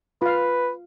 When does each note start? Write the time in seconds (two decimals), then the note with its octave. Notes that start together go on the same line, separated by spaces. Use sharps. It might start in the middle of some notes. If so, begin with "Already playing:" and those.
0.22 F4 B4 F5